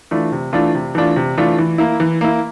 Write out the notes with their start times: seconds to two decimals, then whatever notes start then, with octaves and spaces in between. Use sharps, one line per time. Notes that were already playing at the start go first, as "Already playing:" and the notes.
0.11 E3 A3 D4 F4
0.32 C3
0.53 E3 A3 D4 F4
0.75 C3
0.95 E3 A3 D4 F4
1.16 C3
1.37 E3 A3 D4 F4
1.58 E3
1.78 A#3 E4
2.00 E3
2.21 A#3 E4